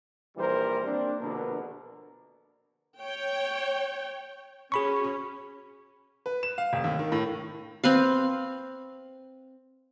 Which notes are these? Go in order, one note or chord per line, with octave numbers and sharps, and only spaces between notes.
A#1 E3 G3 A#4 C5
A#3 C4 D4
A#1 B2 D3 A#4 B4
C#5 G5
C#4 F#4 G#4 B5 C#6
B4
E7
F5
F1
D#2
D#3
A2
C4 B4 F5